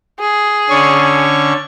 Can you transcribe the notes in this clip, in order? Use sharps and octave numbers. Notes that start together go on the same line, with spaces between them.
G#4
D3 C#4 C#6